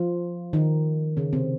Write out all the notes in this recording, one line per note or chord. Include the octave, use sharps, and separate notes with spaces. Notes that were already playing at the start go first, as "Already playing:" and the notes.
Already playing: F3 F4
D#3 D#4
C#3 C#4
C3 C4